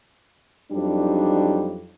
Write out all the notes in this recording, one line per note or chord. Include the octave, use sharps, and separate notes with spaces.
F2 F#3 G3 D4 D#4